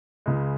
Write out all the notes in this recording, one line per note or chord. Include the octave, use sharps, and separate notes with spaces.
C#2 C#3 G#3